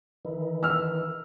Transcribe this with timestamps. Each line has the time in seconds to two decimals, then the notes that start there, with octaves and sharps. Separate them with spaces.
0.25 D#3 E3
0.63 E6 F6